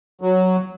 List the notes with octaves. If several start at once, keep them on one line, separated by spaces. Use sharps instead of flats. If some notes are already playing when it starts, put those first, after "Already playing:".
F#3